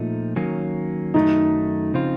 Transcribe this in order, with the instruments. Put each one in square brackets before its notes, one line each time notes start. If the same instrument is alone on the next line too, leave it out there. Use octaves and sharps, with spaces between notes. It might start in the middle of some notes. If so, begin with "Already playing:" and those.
Already playing: [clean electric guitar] A#2 F3 A3 D#4
D#3 F#3 A#3 C#4
[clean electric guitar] F#2 D#3 F#3 A3 [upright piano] D#4
[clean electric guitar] C#3 F3 C4 F4